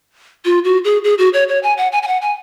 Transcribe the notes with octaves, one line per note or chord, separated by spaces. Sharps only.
F4
F#4
G#4
G#4
F#4
C#5
C#5
G#5
F#5
G#5
G#5
F#5
G#5